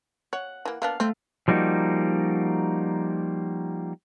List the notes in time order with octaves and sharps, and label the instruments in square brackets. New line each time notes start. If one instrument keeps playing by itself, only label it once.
[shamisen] C#5 [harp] F#5
[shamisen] E3 A#3
[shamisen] A#3 B3 D4 [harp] F5
[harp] A3 [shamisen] C4
[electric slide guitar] F3 G3 A#3 D#4 F#4